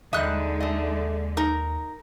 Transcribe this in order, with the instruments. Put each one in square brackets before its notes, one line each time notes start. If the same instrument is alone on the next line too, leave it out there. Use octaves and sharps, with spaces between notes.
[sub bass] D#2 [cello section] D3 G#3 [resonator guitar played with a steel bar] G3 E5 [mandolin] D#4 F#6
[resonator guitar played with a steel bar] A3 D#5
[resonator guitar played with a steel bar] D#4 [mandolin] A#4